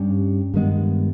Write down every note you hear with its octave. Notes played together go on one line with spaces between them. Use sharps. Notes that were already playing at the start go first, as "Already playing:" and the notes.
Already playing: G2 G3 C#4
G2 D#3 G#3 B3